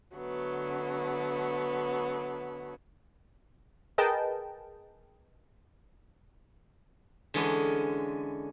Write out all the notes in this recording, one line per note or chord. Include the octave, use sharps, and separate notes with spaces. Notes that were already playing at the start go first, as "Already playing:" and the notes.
D3 F#3 A3 B3
G#4 A#4 B4 D#5 G5 A5
D3 E3 G#3 C#4